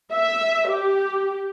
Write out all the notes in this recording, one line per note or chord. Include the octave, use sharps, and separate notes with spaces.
E5
G4